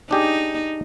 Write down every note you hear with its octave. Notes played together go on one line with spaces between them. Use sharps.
D4 D#4 G4 G#4